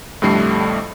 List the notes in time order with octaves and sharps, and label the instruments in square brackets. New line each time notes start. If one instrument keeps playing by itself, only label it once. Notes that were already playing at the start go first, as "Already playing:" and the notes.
[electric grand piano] F2 A2 D3 G3 A3 C7